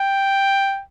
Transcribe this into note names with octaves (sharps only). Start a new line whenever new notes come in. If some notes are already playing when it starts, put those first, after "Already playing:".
Already playing: G5